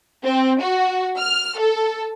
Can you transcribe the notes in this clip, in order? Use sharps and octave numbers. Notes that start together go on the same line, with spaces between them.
C4
F#4
F6
A4